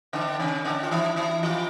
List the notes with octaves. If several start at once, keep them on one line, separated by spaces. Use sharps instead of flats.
D3 D4
C#3 C#4
D3 D4
F4
E3 E4
E3 E4
F3 F4